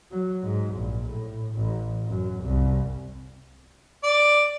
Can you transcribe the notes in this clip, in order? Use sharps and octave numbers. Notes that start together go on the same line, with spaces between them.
F#3
G#2
A#1
A2
A1
F#2
C2
D5